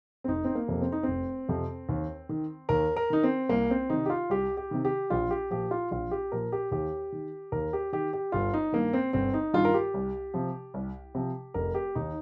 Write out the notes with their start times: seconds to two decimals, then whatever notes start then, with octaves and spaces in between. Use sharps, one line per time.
0.24 C4
0.28 F1 D#4
0.44 C4
0.55 A#3
0.68 F2 C3 F3
0.82 C4
0.92 D#4
1.03 F1 C4
1.49 F2 C3 F3
1.89 D#2
2.29 D#3
2.69 D#2 A#4
2.96 A#4
3.10 D#3 D#4
3.23 C4
3.49 C2 A#3
3.71 C4
3.90 C3 D#3 D#4
4.06 G4
4.10 F4
4.30 C2 G4
4.57 G4
4.71 C3 D#3
4.85 G4
5.10 A#1 F4
5.31 G4
5.50 A#2 F3 G4
5.71 F4
5.91 A#1 F4
6.11 G4
6.32 A#2 F3 A#4
6.52 G4
6.71 D#2 G4
7.12 D#3
7.52 D#2 A#4
7.73 G4
7.93 D#3 G4
8.13 G4
8.32 G1 F4
8.54 D#4
8.73 G2 D#3 A#3
8.93 C4
9.13 G1 C4
9.34 D#4
9.53 G2 D#3 F4
9.65 A#4
9.74 G4
9.94 C2
10.34 C3 F3
10.74 C2
11.15 C3 F3
11.54 F1 A#4
11.74 G4
11.95 D#2 D#3 D#4